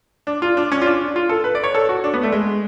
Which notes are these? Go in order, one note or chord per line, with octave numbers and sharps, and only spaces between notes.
D4
F4
D4
C#4
F4
D4
F4
A4
B4
D5
C#5
A4
F#4
D4
B3
A3
G#3